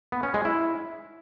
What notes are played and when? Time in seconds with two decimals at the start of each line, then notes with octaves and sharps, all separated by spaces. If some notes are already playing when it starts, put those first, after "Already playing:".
0.12 B3
0.23 C#4
0.34 G#3
0.45 E4